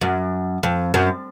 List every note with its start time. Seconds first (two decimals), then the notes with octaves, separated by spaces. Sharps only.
0.01 F#2
0.63 F2
0.94 F#2